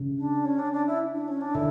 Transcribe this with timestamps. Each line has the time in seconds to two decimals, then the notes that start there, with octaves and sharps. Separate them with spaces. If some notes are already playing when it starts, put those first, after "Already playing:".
Already playing: C#3
0.17 D4
0.45 C#4
0.59 D4
0.73 D4
0.86 E4
1.14 D4
1.28 C#4
1.41 D4
1.54 D3 E4